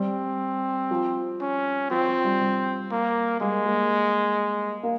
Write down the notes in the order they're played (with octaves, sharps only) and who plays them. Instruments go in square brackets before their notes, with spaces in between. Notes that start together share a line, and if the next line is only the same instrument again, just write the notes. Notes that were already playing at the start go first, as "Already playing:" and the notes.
Already playing: [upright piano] G3 [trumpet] C4
[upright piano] F3
[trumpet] C#4
[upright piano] F3 [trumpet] C4
[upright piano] F3
G3
G3
[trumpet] A#3
[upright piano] G3 A#3 [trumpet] G#3
[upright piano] G3 A#3
A#3